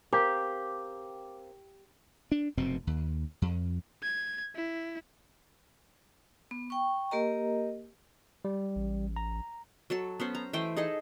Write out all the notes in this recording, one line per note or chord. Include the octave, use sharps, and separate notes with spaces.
C4 G4 A#4 F5 D6
D4
F1 F#2 B2 C4
D#2
F2
G#6
E4
B3
G5 C#6
A#3 G4 A#4 D#5 A#5
G3
A1
A#5
F#3 A4 A5
B3 C#4 C5
A#5
E3 A3 C5 G5
D#4 G#4 A4 D#5